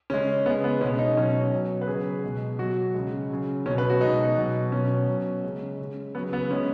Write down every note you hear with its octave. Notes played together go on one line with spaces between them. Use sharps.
C#3 G#3 C#4
C#3 G#3 B3
B3
B2 G#3 C#4
D#4
B2 F#3 C#4
B2 F#3
B4
C#3 F#3 G#4
B2 G#3
B2 F#3 F#4
C#3 G#3
C#3 F#3
B2 F#3 C#4
B4
F#4
B2 G#3 D#4
B2 F#3
B2 F#3 C#4
B2 F#3
C#3 G#3
C#3 G#3
C#3 F#3 B3
B3
C#3 G#3 C#4